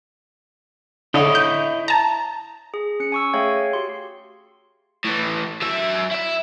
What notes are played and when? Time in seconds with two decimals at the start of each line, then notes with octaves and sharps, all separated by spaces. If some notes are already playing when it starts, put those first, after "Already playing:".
1.14 D3 E4 C#5 D#5
1.35 G6
1.88 A5 A#5
2.74 G#4
3.00 C#4 C#7
3.12 G#5 C#6 E6
3.33 A3 G#4 C#5 F5 G5 G#6
3.73 F#4 G4 C6
5.04 A2 E3
5.62 F#3 E5
6.11 E4 E5